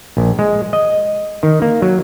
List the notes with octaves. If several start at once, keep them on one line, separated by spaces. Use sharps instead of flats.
A#1
G#3
D#5
D#3
A#3
F#3